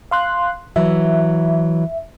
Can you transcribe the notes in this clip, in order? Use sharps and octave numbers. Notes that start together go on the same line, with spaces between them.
F5 C6 F#6
E3 F#3 E5